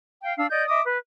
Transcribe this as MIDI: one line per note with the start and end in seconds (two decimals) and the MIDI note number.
0.23 0.36 77
0.23 0.36 79
0.37 0.48 62
0.37 0.48 77
0.37 0.48 88
0.50 0.66 74
0.50 0.66 75
0.50 0.66 91
0.67 0.80 75
0.67 0.80 76
0.67 0.80 86
0.67 0.80 87
0.85 0.97 71